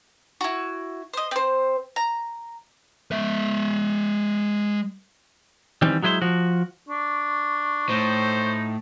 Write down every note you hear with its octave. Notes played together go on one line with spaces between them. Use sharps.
E4 F#4
C5 D#5
C4 C5
A#5
G#3 E5
D#3 E3 G3 C4
F#3 G#3 E4 B4 C5
F3 F#4
D4 C#6
A2 D#4 C5